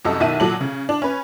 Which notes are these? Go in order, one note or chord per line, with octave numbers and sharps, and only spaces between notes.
C2 F#2 A4 D#5
B1 D#3 E5 A5 D#7
A#2 F#3 A4 F#7
C#3
D4
C#4 B4